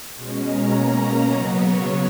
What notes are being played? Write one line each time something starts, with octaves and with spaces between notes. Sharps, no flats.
B2 G#3 C#4
A#5
B2 A#3 C#4 A#5
C#3 F#3 B3 D#5
C#5